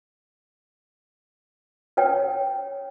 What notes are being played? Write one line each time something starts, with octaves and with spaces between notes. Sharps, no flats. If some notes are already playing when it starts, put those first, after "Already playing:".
B4 C#5 G5